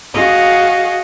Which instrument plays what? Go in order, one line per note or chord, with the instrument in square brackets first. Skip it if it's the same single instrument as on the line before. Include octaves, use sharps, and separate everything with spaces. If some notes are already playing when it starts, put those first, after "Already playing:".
[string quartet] F#4 G#4 D#5 F5